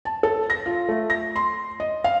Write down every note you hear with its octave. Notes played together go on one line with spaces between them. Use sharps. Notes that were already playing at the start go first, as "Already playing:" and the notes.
A5
A4
A#6
F4
A3
A#6
C6
D#5
F5